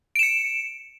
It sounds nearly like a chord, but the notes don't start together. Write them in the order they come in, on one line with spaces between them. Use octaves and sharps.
D7 E7 C#7